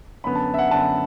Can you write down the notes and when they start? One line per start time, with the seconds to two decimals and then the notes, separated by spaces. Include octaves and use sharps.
0.24 F#2 D3 B3 B5
0.35 A5
0.54 E5
0.59 F#5
0.71 F#2 D3 B3 A5